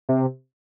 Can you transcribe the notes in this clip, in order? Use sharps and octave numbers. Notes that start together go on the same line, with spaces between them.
C3